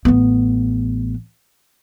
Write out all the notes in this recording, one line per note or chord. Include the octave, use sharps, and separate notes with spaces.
A1 B3